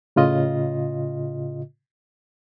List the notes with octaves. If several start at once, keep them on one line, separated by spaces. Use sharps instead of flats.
A2 C#3 F4 D#5